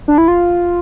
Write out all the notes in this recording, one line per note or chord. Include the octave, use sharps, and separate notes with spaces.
D4
E4
F4